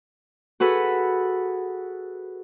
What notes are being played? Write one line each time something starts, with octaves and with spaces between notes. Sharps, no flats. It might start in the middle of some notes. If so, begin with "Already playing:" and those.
F#4 G#4 A4 B4